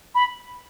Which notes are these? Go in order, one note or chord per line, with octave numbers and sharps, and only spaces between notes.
B5